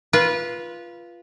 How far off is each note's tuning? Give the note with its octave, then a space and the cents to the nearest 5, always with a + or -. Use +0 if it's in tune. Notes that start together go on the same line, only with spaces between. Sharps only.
F4 -10 B4 -20